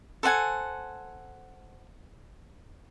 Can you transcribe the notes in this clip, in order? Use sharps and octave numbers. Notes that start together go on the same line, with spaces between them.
A4 C5 F#5 G#5